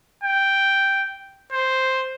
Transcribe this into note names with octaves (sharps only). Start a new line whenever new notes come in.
G5
C5